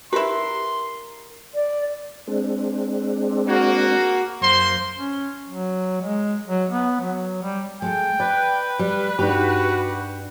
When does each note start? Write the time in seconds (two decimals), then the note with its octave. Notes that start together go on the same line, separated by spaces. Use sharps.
0.13 E4 G4 A#4 B4 C6
1.55 D5
2.27 G#3 C4 D4
3.47 A#3 F#4
4.41 F#2 A#3 C5 C6
4.97 C#4
5.49 F#3
6.02 G#3
6.48 F#3
6.70 B3
7.01 F#3
7.42 G3
7.82 G#3 A4 G5
8.20 B4 D5
8.79 G3
9.19 G2 D4 D#4 F#4 G4